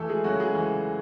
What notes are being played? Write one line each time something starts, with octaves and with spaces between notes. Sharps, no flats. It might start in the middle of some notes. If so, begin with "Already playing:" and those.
Already playing: E3 A3 A4
G#3 G#4
C#3 F#3 F#4
G#3 G#4
E3